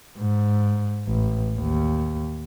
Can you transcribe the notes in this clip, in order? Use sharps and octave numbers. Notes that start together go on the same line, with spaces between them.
G#2
A1
D#2